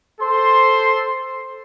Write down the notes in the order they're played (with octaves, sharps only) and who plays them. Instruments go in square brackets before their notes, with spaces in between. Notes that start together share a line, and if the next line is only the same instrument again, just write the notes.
[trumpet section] A4 C5 C6